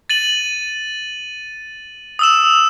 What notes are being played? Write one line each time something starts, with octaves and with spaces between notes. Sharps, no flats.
A6 D#7 F#7
D#6 E6 E7